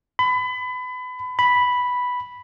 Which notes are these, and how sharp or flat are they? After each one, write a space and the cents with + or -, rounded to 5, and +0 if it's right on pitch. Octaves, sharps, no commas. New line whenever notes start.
B5 +30
B5 +0